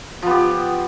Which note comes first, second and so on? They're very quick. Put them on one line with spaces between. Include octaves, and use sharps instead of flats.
F3 B3 G4